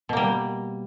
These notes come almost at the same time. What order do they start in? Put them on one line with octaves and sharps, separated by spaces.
B2 A#3 G3